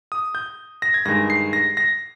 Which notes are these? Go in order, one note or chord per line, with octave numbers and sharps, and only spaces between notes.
D#6
G6
A#6
G#6
G2 D#3 G#3 A#6
C7
A#6
A#6